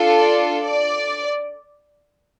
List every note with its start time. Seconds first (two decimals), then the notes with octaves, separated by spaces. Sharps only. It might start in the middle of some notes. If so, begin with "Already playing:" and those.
Already playing: D4 F4 A4
0.18 D5
0.62 D5